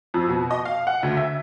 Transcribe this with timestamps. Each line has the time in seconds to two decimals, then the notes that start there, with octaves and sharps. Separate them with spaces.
0.14 F2
0.29 B2
0.51 D#5
0.65 F5
0.87 F#5
1.03 D2
1.17 E5